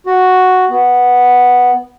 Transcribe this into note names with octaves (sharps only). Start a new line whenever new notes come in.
F#4
B3